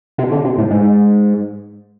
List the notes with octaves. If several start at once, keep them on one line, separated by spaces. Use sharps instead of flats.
C3
D3
C3
A2
G#2